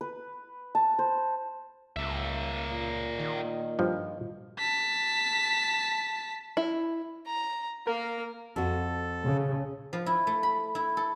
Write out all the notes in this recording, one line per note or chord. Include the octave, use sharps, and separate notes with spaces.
B4
A5
C5
C#2 A#3 E5
A#2
D#3
G2 F3
A5 B6
E4
A#5
A#3 A#4 F5
F2 F#4 A4
C#3
F3
E4
A3
B5
E4
A4